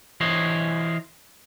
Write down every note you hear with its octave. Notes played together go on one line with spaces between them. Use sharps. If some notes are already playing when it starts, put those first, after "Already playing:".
E3 C5 C#5 D#5